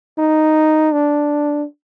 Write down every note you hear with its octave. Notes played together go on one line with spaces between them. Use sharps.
D#4
D4